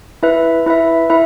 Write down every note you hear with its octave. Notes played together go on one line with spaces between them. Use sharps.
E4 B4 E5
E4 B4 E5
E4 B4 E5